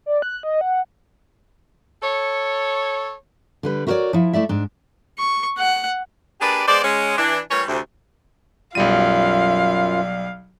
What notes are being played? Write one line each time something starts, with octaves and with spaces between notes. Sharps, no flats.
D5
F#6
D#5
F#5
A4 C#5
D3 G3 B4
E4 F#4 A#4 B4 C#5 D5
F3 E4
A3 E4 D5 E5
G#2 D4
C#6
F#5
A#3 D4 G4 G#4 B4 D5
G#3 B3 C5 D5
G#3 C#4
E3 D4
E3 G3 A3 A#4 C#5
D2 C3
B1 F#2 F#3 G3 F4 D5 F5 D#7